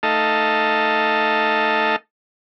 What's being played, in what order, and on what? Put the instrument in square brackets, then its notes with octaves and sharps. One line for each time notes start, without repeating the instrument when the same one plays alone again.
[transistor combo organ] A3 D#4 A4 D#5 F5 A5